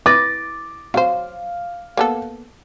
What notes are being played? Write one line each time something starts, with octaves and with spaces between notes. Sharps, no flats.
E4 B4 D6 A6 A#6
F#3 C5 F5
A#3 B3 A4